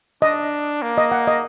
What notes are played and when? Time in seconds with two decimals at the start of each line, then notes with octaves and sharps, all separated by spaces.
0.22 D4 D#5
0.82 A#3
0.98 D#5
1.12 F#5
1.27 D#5